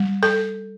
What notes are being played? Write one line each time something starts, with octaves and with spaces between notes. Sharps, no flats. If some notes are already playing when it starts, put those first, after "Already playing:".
Already playing: G3
A4